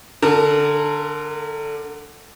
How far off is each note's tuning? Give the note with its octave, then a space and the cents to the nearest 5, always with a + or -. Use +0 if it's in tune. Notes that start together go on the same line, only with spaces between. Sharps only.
D3 +5 A#4 -25 A5 -10